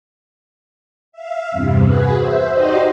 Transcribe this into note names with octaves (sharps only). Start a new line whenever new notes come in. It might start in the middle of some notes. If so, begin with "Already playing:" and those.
E5 F5
E2 G2 C3
F#4 G#4 B4
C5 E5
D#4 F#4 G4 C5 D5 D#5